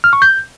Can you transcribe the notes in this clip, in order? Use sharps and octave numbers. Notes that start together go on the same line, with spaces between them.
F6
C#6
G6